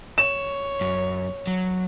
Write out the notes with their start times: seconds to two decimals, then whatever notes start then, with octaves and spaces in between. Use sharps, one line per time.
0.18 C#5 E7
0.81 F#2
1.47 F#3